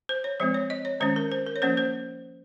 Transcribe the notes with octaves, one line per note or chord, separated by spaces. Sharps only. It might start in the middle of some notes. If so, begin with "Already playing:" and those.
C5
C#5
F3 G#3 C4 C5
C#5
D#5
C#5
D#3 G#3 C#4 C5
A#4
C5
A#4
C#5
F3 A#3 C#4 C5
C5